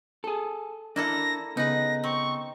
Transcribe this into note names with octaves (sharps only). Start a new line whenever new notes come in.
G#4 A4
A#3 D4 E4 A4 A#6
C#3 B3 D#4 B4 A#6
C4 C#6